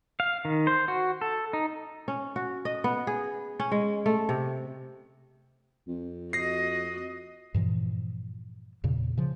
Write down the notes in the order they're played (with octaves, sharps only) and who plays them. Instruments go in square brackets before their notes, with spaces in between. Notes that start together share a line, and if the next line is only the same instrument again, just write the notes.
[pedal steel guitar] F5
D#3
C5
F#4
A4
D#4
[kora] C#4
F#4
D#5
B3
G#4
C#4
G#3
A3
C3
[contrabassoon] F2
[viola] F#4 D#5 [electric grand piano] A#6 C7
[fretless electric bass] G2 A#2 E3 F3
E2 A#2 C#3
C#3 F3